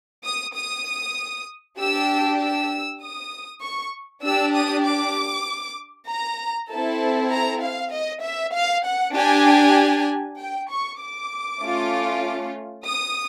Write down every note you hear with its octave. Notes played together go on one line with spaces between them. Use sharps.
D#6
D#6
D4 G4 E6
E6
D#6
C#6
D4 G4 E6
D#6
D6
A#5
C4 E4 A4 A5
A#5
F5
D#5
E5
F5
F#5
D4 G4 G#5
G5
C#6
D6
A3 C#4 F4
D#6